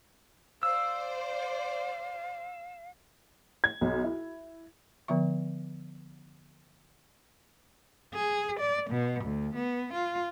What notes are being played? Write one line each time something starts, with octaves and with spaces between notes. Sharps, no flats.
C5 D5 F5 E6
G#6
B1
E4
D3 F3 B3 E5 C#6
G#4
D5
B2
D2
B3
F4